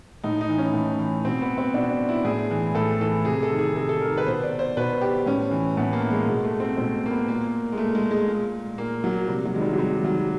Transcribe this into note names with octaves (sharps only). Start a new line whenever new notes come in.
A2 D#4
D#4
E3
C#4
A2
E3
B2 C4
B3
C4
B2 D4
E4
A2 G#4
E3
A2 A4
E3 A4
C3 G#4
A4
D#3
G#4
C3 A4
A4
D#3 A#4
B4
B2 C5
D5
C5
B2 B4
G4
A2 C#4
E3
A2 B3
A#3
E3
G#3
B2 G#3
A3
C4
B2 C4
A#3
B3
A#2 A#3
G#3
A#2 A3
G#3
G#3
A#2
A#2 A#3
F#3
C3 G3
F#3
D#3 G#3
G3
F#3
C3 G3
D#3 F#3